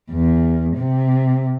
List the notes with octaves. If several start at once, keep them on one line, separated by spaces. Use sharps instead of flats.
E2
C3